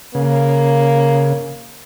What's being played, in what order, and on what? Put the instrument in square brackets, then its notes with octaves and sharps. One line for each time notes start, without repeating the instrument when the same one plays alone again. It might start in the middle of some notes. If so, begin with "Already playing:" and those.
[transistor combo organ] C#3 [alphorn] A#3